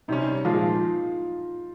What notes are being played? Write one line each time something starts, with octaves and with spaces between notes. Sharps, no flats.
C3 G3 C#4 D#4
A#2 F3 G#3 F4